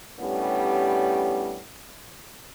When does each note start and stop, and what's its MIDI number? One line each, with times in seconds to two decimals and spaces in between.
0.19 1.61 45
0.19 1.61 55
0.19 1.61 59
0.19 1.61 61
0.19 1.61 62
0.19 1.61 67